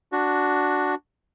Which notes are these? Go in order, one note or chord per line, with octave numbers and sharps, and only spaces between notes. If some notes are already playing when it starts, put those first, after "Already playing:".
D4 F#4